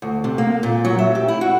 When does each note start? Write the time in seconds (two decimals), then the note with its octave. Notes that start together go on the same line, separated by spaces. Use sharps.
0.02 D2
0.24 C3
0.38 A#3
0.63 A#2
0.85 F#3
0.98 E5
1.15 G4
1.28 E4
1.41 F#4